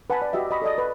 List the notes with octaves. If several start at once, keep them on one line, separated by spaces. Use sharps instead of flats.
B4 F#5 G#5 A5 B5
D5
F#4 G4 D#5 E5
D#5 B5 C#6
A4 D5 D#5
B4